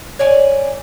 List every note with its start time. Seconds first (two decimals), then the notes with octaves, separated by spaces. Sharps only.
0.19 C#5 D5 G#5